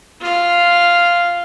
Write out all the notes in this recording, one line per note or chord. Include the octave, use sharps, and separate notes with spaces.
F4 F5